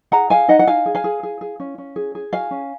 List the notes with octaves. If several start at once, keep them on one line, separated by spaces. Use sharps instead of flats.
G#4 F#5 A#5
G#4 F5 G#5
D#4 D#5 F#5
F#5
D#4 F5 G#5
G#4
F5 G#5
G#4
G#4
G#4
C#4
C#4
G#4
G#4
F#4 F5 G#5
C#4